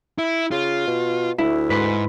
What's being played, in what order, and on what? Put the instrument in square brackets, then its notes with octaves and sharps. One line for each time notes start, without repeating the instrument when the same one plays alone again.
[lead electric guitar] E4
[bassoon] C#3 [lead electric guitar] F4
[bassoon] B2
[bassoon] D2 [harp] E4
[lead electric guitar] G#2 [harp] B4 C6